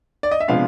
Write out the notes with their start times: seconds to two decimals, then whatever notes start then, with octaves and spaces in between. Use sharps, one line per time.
0.23 D5
0.31 D#5
0.40 E5
0.48 C3 F3 G#3 B3 D4 F5